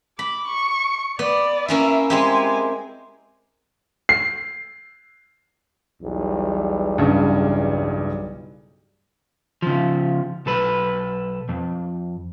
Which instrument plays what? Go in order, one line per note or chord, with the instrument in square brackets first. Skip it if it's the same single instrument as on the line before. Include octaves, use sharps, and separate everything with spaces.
[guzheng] B5 [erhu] D6
[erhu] C#6
[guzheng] B3 [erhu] D5
[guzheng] A#3 C#4 E4 [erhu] E5
[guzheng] G#3 C4 G4 [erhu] G#5
[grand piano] C7
[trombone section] B1 E2 G3
[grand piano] G2 C#3
[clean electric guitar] C#3 F3
B1 A4 B4
F2